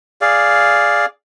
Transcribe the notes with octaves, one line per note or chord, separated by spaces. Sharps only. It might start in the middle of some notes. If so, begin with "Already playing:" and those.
G#4 D5 F5